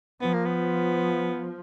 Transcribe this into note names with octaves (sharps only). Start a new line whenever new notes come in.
F3 B3
A#3
B3